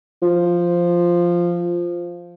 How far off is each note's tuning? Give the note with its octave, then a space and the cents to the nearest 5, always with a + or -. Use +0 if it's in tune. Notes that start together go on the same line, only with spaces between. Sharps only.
F3 -5